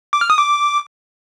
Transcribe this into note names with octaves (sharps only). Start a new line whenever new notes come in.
D6
F6
D#6
D6